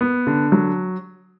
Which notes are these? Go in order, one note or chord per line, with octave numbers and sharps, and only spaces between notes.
B3
D3
F#3